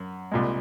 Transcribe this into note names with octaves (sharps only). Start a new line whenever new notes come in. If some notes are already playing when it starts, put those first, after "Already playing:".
Already playing: F#2
C2 A#2 G#3